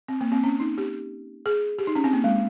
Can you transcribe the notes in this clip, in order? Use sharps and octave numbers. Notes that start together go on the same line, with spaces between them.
C4
A#3
C4
C#4
D#4
G4
G#4
G4
D#4
C#4
C4
A#3
G#3